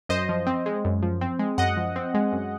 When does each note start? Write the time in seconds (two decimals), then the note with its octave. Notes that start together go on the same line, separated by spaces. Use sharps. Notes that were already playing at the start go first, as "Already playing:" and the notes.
0.09 F#2 C5 D#5
0.29 F3
0.47 C4
0.66 G#3
0.85 F#2
1.03 F3
1.21 C4
1.39 G#3
1.58 F#2 D#5 F#5
1.77 F3
1.96 C4
2.14 G#3
2.33 F#2